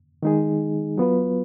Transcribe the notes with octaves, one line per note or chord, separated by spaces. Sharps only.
D#3 G#3 D#4 G#4
F#3 B3 F4 B4